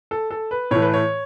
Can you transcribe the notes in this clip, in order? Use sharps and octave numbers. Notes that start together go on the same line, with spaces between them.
A4
A4
B4
A2 E3 A3 C#5
B4
C#5